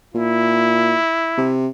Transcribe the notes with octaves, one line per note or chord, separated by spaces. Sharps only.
A#2 E4
C3